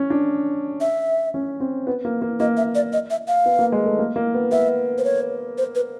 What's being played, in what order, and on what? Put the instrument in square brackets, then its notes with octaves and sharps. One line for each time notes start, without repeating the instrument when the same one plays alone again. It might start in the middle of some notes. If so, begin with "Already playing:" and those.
Already playing: [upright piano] C#4
D4
[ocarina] E5
[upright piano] C#4
C4
B3
A#3
A#3
[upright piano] A#3 [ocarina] D#5
[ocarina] E5
D5
D#5
E5
F5
[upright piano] B3
A#3
G#3
A3
A#3
A#3
B3
[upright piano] B3 [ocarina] E5
[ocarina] C5
C#5
C5
B4